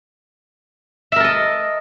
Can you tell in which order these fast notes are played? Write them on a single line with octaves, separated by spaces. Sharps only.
E5 A#4 A4 D#5